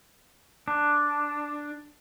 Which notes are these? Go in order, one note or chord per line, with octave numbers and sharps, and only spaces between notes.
D4